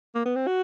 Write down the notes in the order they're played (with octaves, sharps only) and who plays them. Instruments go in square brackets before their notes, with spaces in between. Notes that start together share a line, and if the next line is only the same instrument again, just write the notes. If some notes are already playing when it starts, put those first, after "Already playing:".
[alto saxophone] A#3
B3
C4
F#4